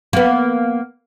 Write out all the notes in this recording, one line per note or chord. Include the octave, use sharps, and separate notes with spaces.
A#3 B3